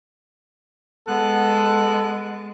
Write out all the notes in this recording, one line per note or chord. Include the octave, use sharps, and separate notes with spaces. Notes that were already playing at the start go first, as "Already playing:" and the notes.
G#3 B3 A4 F#6